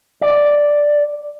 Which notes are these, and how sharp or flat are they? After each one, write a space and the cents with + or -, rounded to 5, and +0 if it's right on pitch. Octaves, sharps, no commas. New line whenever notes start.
D5 +0